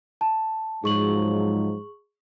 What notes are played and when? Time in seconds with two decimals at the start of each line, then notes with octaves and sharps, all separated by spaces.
0.21 A5
0.84 G#2 F3 F#3 G#4 C#6 F#7